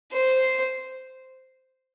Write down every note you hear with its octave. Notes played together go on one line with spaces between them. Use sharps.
C5